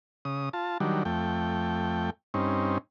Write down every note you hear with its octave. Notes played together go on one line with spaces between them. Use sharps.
C#3 D#6
F4 A5
D#3 F#3 G3 D4
F2 A3 G5
G2 C4 C#4 D#4